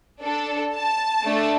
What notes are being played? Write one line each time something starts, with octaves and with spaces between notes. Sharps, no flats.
D4 A4
A5
A3 D4 A4